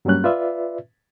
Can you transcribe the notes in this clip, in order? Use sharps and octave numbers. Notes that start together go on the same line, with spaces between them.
G2 F#3 G3 A#3 C#4 F#6
F4 B4 D5 E5